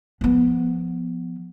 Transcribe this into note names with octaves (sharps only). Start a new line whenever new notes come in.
F3 B3